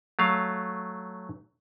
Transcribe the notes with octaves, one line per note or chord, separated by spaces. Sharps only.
F#3 A3 F5